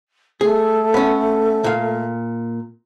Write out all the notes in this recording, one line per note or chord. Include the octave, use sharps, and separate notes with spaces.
A3 G#4
B3 C#4
A#2 F5